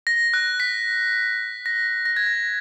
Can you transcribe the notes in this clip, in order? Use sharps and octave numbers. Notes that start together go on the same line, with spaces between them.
A#6
F#6
B6
A#6
A#6
G#6
A#6